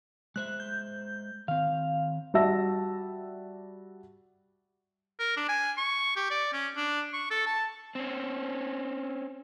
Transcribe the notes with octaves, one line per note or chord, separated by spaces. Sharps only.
G#3 C5 E5 F#6
G6
D#3 C4 F5
G3 F#4 E5 A5 E6 A#6
A#4
D4
G#5
C#6
G4
D5
C#4
D4
C#6
A4
A5
C4 C#4